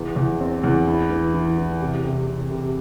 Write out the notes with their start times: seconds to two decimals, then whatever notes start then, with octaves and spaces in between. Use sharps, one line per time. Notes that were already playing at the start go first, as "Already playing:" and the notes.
Already playing: E2
0.16 E2
0.40 C4
0.64 E2
0.88 E4
1.10 E3
1.34 E3
1.58 E3
1.80 C3
2.04 C3
2.28 C3
2.51 C3